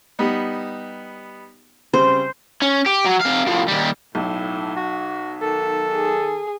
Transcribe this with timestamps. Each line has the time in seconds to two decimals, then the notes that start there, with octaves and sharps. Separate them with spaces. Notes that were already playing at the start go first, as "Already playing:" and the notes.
0.19 G3 B3 D#4
1.94 C#3 G3 C4 C5
2.62 C#4
2.86 G4
3.05 F#3
3.21 C3 F5
3.47 A2 F3
3.68 D#2 G3
4.15 B1 A2
4.76 F#4
5.43 D#3 A4
5.93 G#4